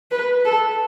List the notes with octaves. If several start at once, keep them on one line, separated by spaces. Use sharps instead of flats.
B4
A4